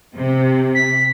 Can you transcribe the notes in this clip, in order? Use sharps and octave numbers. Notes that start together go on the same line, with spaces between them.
C3
B6